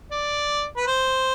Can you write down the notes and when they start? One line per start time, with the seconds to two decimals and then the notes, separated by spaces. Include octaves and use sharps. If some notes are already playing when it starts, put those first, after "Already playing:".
0.11 D5
0.76 B4
0.87 C5